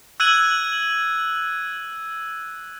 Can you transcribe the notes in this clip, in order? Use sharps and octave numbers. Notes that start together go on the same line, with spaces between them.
E6 F#6 G#6 D#7 F#7